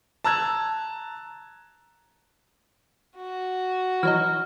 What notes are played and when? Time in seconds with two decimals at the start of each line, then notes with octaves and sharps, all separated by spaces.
0.24 A5 A#5 E6 F#6 G#6
3.16 F#4
4.03 E3 F#3 D#4 F6